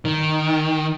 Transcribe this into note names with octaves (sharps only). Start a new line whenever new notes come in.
D#3